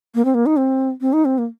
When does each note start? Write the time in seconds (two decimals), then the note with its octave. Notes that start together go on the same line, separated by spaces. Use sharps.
0.15 A#3
0.25 C4
0.34 A#3
0.46 D#4
0.58 C4
1.01 C4
1.13 D#4
1.25 C4
1.38 A#3